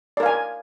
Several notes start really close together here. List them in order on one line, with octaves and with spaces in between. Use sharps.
D5 A#4 F5 G#5